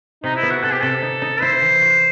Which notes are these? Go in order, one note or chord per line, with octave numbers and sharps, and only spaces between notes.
C3 D#4
E4
B3
F#4
C3 A4
G4
C3 A4
D#4
D#4
E4 C5
E3
F#4